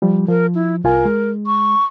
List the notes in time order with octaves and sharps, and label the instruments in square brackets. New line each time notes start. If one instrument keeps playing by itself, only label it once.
[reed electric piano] F3 G3
[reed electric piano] F3 [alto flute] A#4
[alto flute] E4
[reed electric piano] C2 F4 G#5 [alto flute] A#4
[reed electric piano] G#3
[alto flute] C#6